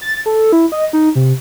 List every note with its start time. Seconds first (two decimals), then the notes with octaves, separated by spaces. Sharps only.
0.02 A6
0.26 A4
0.52 E4
0.72 D#5
0.93 D#4
1.15 C3